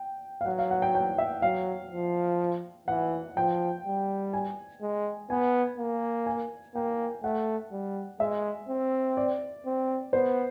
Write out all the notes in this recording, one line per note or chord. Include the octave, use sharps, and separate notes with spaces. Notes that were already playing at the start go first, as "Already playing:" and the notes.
Already playing: G5
F5
F#3 F#5
F5
F#5
G5
G5
E5
F#3 F5
F3
E3 F#5
F3 G5
G3
G#5
G#3
B3 G#5
A#3
G#5
A#3 G5
A3 F#5
G3
G#3 E5
C4
D5
C4
B3 C5